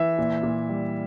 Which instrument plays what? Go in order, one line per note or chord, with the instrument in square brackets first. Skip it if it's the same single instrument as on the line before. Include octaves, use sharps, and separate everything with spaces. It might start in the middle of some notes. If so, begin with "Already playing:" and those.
Already playing: [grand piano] E3 E5
A#2
A#2
G3